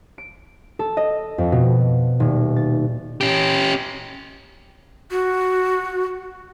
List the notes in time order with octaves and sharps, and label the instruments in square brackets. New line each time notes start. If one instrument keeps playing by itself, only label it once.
[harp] D7
A4
D#5
F2
B2
D#1
A6
[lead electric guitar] C#4 G4
[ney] F#4